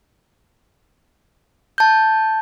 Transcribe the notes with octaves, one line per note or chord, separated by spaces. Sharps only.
A5 G6